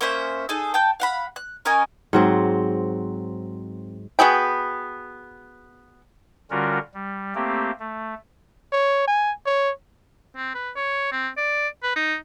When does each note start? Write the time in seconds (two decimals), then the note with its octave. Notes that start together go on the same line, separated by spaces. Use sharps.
0.01 A#3 C#4 C5 E5
0.49 D#4 G#4 A4
0.74 G5 A5 G6
1.00 F5 F#5 B5
1.36 F#6
1.65 C#4 A#4 D#5 G#5
2.13 G#2 F#3 C4
4.19 B3 F#4 G#4 G5
6.51 D3 G3 C#4 F4 F#4 A#4
6.94 G3
7.35 A3 A#3 C4 G4
7.80 A3
8.72 C#5
9.07 G#5
9.46 C#5
10.36 C4
10.55 B4
10.76 C#5
11.12 C4
11.37 D5
11.83 B4
11.96 D#4